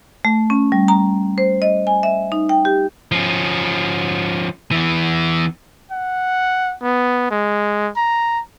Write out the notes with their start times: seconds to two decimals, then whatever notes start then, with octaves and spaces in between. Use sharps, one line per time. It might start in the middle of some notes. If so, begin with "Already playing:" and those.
0.25 A3
0.50 C#4
0.72 G3
0.88 A#5
1.38 C5
1.62 D#5
1.87 G#5
2.03 E5
2.32 D#4
2.49 G5
2.65 G4
3.12 F3 C#4
4.71 E2 E3
5.92 F#5
6.83 B3
7.31 G#3
7.97 A#5